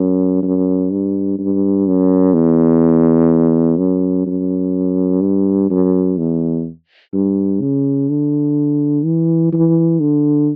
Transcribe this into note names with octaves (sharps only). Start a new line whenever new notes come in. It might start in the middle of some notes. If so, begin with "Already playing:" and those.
Already playing: F#2
F#2
G2
G2
F#2
E2
F#2
F#2
G2
F#2
E2
G2
C#3
D3
E3
E3
D3